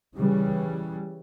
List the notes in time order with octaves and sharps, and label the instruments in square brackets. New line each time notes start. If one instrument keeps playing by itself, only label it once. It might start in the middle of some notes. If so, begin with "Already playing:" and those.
[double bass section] C#3 E3 G3